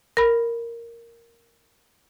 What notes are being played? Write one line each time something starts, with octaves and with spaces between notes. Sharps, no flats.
A#4 B5